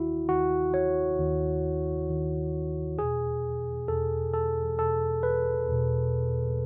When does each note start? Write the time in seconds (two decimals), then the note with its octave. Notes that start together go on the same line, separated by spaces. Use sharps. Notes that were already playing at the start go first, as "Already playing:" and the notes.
Already playing: D#2 D#3 E4 F#4
0.28 D#2 D#3 F#4
0.74 C#5
1.19 D#2 D#3
2.09 D#2 D#3
2.98 E2 B2 G#4
3.88 E2 B2 A4
4.34 A4
4.79 E2 B2 A4
5.23 B4
5.68 E2 B2